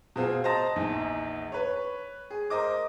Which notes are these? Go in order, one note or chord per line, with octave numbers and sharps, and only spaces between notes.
B2 C4 F4 G#4
C5 D#5 A5 A#5 A#6
A#1 E2 D#4
B4 C#5
G#4
A#4 C5 D#5 D6